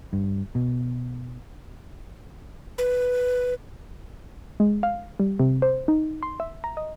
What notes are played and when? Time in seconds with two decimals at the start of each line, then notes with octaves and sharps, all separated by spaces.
0.13 G2
0.55 B2
2.78 B4
4.60 G#3
4.83 F5
5.20 G3
5.39 C3
5.62 C5
5.88 D#4
6.23 C6
6.40 E5
6.64 A#5
6.77 D#5